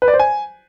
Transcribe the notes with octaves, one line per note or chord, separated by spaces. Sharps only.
B4
D5
C5
G#5